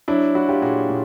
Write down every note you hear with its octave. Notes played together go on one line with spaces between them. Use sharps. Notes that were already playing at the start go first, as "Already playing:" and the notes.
F#3 D4 E4
F#3 E4 F#4
F4 G4
A#2 F#4 G#4
A#2